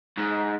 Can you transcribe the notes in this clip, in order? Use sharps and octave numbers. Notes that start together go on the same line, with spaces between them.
G#2